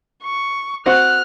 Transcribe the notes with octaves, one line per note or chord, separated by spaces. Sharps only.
C#6
C4 F#4 F#5 F6 F#6